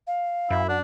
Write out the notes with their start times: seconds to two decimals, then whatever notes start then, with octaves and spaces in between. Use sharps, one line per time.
0.07 F5
0.50 F#2 E4
0.69 D4 F#5